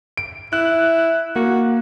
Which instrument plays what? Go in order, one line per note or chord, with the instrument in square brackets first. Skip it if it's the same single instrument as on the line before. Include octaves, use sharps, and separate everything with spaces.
[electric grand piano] D7
[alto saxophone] E4 [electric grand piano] F#6
[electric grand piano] A#3 [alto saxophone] F#4